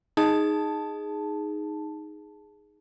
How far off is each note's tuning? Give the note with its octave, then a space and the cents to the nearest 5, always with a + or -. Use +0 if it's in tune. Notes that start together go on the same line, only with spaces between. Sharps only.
D#4 +0 G#4 +0 A5 +0